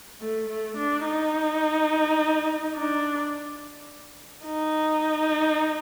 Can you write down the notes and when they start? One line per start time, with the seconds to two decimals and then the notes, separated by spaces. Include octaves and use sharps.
0.20 A3
0.49 A3
0.77 D4
1.06 D#4
2.75 D4
4.45 D#4